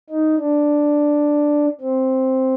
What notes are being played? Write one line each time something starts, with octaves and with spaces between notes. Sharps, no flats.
D#4
D4
C4